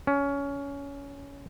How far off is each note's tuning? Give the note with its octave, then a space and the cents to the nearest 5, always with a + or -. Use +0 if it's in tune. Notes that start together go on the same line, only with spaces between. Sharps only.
C#4 +20